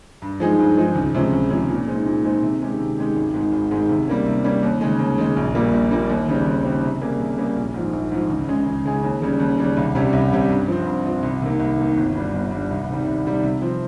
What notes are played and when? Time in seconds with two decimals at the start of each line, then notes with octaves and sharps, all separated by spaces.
0.22 G2
0.40 F3 G#3 D#4 G#4
0.59 G2
0.77 F3 G#3 D#4 G#4
0.95 C#2
1.14 C3 F3 G#3 C#4
1.33 C#2
1.50 C3 F3 G#3 C#4
1.69 A#2
1.87 G#3 C4 D#4
2.06 A#2
2.24 G#3 C4 D#4
2.43 C3
2.61 D#3 G#3 C#4 G4
2.79 C3
2.98 D#3 G#3 C#4 G4
3.16 G#1
3.34 G#2 D#3 G#3
3.52 G#1
3.71 G#2 D#3 G#3
3.89 C3
4.08 G3 A#3 C#4
4.26 C3
4.44 G3 A#3 C#4
4.63 D#2
4.81 C#3 G#3
4.99 D#2
5.18 C#3 G#3
5.36 A#1
5.55 A#2 G3 A#3
5.73 A#1
5.91 A#2 G3 A#3
6.09 D#2
6.28 C#3 G3 C4 G4
6.46 D#2
6.64 C#3 G3 C4 G4
6.83 C3
7.01 G3 A#3 C#4 G#4
7.19 C3
7.38 G3 A#3 C#4 G#4
7.56 A#1
7.74 G#2 F3
7.93 A#1
8.12 G#2 F3
8.30 C#2
8.48 C#3 G#3 C#4 G#4
8.66 C#2
8.85 C#3 G#3 C#4 G#4
9.03 D#2
9.22 C#3 G3 C#4
9.40 D#2
9.58 C#3 G3 C#4
9.77 C2
9.95 C3 G3 C#4 G4
10.13 C2
10.32 C3 G3 C#4 G4
10.50 G2
10.68 F3 C4
10.87 G2
11.05 F3 C4
11.23 C2
11.42 C3 D#3 A#3
11.60 C2
11.78 C3 D#3 A#3
11.97 G1
12.15 G2 G3
12.33 G1
12.51 G2 G3
12.71 C2
12.89 C3 D#3 G3
13.06 C2
13.25 C3 D#3 G3
13.43 C3
13.62 F3 C4